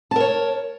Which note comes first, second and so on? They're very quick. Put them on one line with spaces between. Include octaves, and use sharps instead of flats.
A5 A#4 C#5